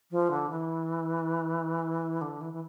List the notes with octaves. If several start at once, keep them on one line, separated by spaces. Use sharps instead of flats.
F3
D3
E3
D3
E3
E3